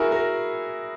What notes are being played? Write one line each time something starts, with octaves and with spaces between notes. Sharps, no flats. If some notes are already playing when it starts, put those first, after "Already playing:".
Already playing: E4 F#4 G#4 A#4
F#4 A#4